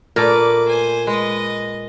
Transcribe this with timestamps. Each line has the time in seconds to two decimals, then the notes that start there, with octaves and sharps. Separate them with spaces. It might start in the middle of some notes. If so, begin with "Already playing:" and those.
0.16 A#2 A3 A#4 B4 D6
0.68 C5 G#5
1.07 G#3 B4 D#5